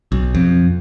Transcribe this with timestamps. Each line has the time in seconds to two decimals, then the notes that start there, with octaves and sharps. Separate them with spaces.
0.12 B1
0.35 F2